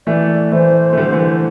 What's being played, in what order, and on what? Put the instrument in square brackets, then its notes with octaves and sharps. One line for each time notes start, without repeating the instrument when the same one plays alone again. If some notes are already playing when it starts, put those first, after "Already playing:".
[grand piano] E3 A3 [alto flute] D5
[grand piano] E3 A3 [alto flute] C5
[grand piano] A3
D3 G3
E3 A3